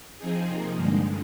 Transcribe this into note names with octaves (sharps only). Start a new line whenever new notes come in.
F3 C4 D#4 G#4
C3 F3 A#3 D#4
G2 D3 G#3